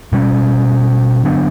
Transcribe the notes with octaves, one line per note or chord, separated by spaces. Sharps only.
B2 G3 C#4
D3 F#3 B3 D4